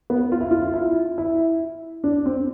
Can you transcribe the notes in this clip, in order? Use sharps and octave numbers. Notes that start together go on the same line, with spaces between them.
B3
F4
E4
F4
F4
E4
E4
D4
C4